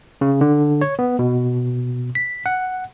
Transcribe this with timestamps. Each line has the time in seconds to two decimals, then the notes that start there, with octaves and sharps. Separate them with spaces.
0.21 C#3
0.41 D3
0.81 C#5
0.99 B3
1.19 B2
2.15 B6
2.46 F#5